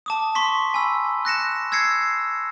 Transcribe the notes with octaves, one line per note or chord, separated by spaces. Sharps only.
A5 D6 D#6
C6 C#6 B6
G#5 B5 E6
F#6 A#6 C#7 E7
E6 G#6 A#6 C7 C#7